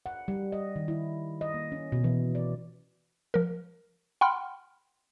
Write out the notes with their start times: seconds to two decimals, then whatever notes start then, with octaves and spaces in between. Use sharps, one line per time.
0.06 F#5
0.28 G3
0.52 D#5
0.76 D#3
0.88 E4
1.41 D#5
1.54 A#3
1.72 C#4
1.92 B2
2.04 E3
2.35 D5
3.34 F3 A#4
4.21 F#5 G5 B5 C6 F6